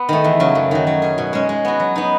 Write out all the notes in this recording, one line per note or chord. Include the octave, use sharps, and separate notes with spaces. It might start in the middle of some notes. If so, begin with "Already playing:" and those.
Already playing: B3
D#3 A3
E2
C#3 F#3
F#2
D#3 F#3
F#3
C#4 G#4
B2
G#3 C#4
G#3
B3 F#4
F#3
B3 D#4